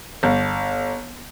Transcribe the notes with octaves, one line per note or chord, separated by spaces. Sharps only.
G1